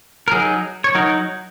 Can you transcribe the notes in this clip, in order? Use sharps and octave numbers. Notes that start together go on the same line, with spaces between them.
A#4
F#3 D#4 G#4
C#5
F#3 D#4 A#4